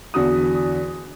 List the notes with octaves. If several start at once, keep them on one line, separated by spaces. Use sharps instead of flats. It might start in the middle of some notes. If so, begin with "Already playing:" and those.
E2 D3 F#4 D#6